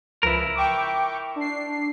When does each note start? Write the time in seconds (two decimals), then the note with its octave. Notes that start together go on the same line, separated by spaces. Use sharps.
0.23 C#2 F3 E4 A#4 B4
0.55 G5 C#6 D6
1.35 D4 C7